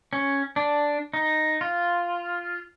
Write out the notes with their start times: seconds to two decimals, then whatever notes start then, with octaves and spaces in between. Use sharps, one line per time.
0.13 C#4
0.56 D4
1.14 D#4
1.61 F4